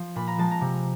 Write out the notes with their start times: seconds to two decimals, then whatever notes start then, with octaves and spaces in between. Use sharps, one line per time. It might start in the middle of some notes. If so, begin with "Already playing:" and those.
Already playing: F3
0.16 A#2 B5
0.27 A#5
0.38 F3 G#3 A5
0.51 A#5
0.61 C3